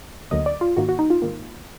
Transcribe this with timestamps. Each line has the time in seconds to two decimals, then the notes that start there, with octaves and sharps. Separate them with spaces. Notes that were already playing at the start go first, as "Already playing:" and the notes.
0.31 D2 D3 F#3 A#3 D#5
0.46 D5
0.61 F4
0.77 G#2 D#3 A#3 F#4
0.89 F#4
0.99 D#4
1.10 F4
1.22 G#2 D#3 A#3